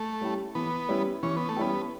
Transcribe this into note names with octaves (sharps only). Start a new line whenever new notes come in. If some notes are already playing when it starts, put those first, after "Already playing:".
Already playing: A3
G3 C#4 E4 G4
E3 B3
G3 C#4 E4 G4
E3 C#4
B3
A3
G3 B3 C#4 E4 G4